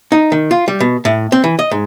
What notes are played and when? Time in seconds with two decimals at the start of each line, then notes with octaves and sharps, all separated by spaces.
0.12 D#4
0.32 D#3
0.51 F4
0.68 G3
0.80 B2
1.05 A2
1.32 C4
1.44 E3
1.59 D#5
1.71 G#2